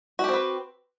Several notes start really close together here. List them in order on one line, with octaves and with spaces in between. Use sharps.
F#4 G4 C4 B4